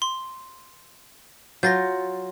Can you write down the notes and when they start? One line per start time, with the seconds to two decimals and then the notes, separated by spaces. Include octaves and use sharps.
0.02 C6
1.63 F#3 F4 G6 A6 A#6